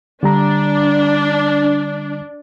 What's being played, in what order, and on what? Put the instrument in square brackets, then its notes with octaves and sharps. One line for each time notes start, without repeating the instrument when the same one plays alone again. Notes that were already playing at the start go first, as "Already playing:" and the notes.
[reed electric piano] D3 G3 A#5 [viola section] D4